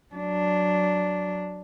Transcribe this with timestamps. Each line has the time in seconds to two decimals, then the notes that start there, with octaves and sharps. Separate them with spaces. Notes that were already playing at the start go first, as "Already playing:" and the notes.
0.14 F#3 D4